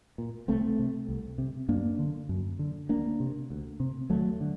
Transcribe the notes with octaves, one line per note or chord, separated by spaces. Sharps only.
A#2
C2 A3 C4
C3
C2
C3
F#2 A#3 D4
D3
F#2
D3
D2 A#3 D4
C3
D2
C3
D#2 F#3 A3
D3